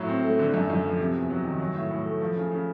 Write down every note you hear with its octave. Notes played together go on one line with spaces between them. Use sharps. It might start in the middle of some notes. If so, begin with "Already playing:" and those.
Already playing: A2 F#3
C4
A3
D3
F#2
F#2
F3
C3
E2
F#3
D#3
F#3
A2
A2
A3
F3
C#3
C#3